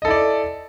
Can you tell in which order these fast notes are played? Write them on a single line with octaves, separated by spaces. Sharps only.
D#5 A4 E4 D5